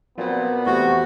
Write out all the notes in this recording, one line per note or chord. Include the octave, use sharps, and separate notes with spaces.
A#2 F3 F#3 B3 C4
E2 C3 A3 F#4